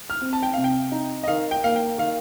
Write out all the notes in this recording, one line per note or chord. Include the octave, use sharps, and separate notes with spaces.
F6
C4
A5
G5
C3 F5
G5
D#4
D#5
D#3 F5
G5
A#3 F5
G5
D#3 F5